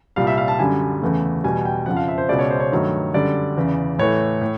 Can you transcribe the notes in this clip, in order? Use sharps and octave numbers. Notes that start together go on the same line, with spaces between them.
C2 A#2 G3 F5
E5
F5
A5
F#2 D3 G3 G#5
E2 C#3 E3 A3
E2 B2 G3 G#5
G5
F2 C#3 F3 F#5
F5
E5
C5
C#2 B2 G#3 D5
C#5
C5
C#5
G2 D#3 F#3 A3
F#2 D3 G3 D5
E2 C#3 E3
A2 E3 A3 C#5
A2